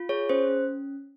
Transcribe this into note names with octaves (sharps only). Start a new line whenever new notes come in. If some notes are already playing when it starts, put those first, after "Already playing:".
Already playing: F4
G#4 C#5
C#4 C5
C#4